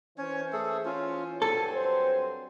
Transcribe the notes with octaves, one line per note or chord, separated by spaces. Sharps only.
E3 C#4 C5 C#5
A3 G#4 A4
C#4 F4
G2 F#3 C4 A4 G#5
C5